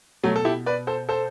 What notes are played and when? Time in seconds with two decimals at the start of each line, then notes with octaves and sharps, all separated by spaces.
0.23 B2 F#3 A3
0.36 A4
0.45 E4 G4
0.66 B4 D5
0.87 A4 C5
1.09 A4 C5